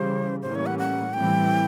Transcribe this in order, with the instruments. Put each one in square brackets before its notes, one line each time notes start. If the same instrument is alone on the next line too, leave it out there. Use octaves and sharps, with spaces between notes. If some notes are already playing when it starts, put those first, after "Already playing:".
Already playing: [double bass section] C#3 E3 G3 [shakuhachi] C5
[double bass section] A2 E3 G3 A#3 C#4 [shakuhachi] C5
[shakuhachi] C#5
F#5
F#5
[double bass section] A2 E3 G3 C4 [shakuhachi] G5